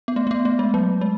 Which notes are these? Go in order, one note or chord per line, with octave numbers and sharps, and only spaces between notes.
B3
A3
A3
B3
A3
G#3
F#3
G#3